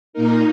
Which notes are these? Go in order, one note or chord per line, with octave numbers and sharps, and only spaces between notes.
A#2 A#3 D#4 A#4